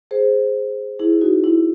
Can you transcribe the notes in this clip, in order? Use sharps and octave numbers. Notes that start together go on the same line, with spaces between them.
G#4 C5
E4 G#4
D#4 F#4
E4